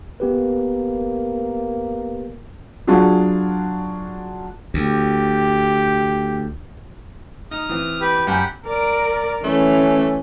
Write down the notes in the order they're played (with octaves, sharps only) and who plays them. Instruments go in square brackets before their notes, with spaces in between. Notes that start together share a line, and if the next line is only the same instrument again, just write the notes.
[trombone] A#3 [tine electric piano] B3 G4 B4
[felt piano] F#3 D4 F4 F#4 G#4
[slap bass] D2 [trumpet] G4
[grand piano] D#4 [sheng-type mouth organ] D#6 F6
[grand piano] E3 C4
[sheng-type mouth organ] G4 B4
[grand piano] F#2 G#5 G6 [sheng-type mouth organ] G4 F#5 B5
[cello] A#4 D5
[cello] E3 [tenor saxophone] A3 [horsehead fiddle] C#4